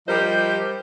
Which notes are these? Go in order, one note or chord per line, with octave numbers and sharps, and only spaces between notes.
F3 G3 G4 A#4 C5 D#5